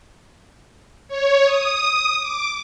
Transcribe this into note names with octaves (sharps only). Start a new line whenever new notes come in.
C#5
D#6
D6